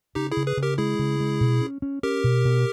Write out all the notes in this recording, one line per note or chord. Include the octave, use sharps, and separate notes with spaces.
C#3 D#4 G4
E4 G#4
C#3
G#4 B4
C#3
G4 A#4
G#3 E4 G#4
C#3
G#3
B2
C#4
C#4
C#4 G4 A#4
B2
B2